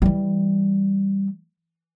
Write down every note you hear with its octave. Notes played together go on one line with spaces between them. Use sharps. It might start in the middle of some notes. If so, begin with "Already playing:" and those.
E3 G3